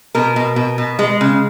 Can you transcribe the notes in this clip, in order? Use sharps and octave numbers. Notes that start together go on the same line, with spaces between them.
B2 A#4
B2
B2
B2
G#3
C#3